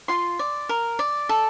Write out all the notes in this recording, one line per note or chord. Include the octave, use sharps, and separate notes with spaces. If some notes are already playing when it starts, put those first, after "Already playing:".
F4 C6
D5
A#4
D5
A4